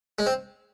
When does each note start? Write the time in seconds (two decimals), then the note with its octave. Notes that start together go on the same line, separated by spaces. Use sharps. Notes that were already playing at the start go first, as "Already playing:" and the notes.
0.19 G#3
0.26 C4